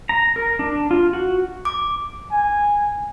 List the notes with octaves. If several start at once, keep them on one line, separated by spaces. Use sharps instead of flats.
A#5
A#4
D4
F4
F#4
D6
G#5